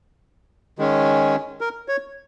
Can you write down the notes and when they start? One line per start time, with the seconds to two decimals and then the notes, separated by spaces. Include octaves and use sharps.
0.79 D#3 G#3 C#4
1.61 A#4
1.88 C#5